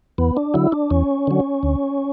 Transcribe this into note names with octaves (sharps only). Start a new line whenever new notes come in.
E2 B3
D4
D3 F#3 E4
D4
E2 C#4
D3 F#3
D2